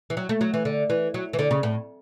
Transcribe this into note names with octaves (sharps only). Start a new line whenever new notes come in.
E3
F#3
A3
F#3
E3
D3
E3
F#3
E3
D3
C#3
A2